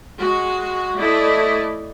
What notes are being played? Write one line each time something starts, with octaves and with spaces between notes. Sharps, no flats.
G#3 F#4
A3 E4 D5 D#5